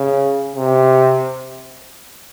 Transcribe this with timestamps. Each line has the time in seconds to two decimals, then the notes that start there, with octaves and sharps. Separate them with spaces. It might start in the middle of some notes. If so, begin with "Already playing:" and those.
Already playing: C#3
0.56 C3